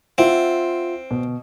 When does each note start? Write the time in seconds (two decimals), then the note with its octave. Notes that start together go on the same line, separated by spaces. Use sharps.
0.18 C4 F4 E5 F#5
1.11 B2